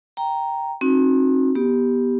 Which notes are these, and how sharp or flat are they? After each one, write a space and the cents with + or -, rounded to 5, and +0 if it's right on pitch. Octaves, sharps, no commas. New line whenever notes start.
G5 +0 A#5 +0
C4 +40 D#4 +0 F#4 -10
B3 -20 G4 +0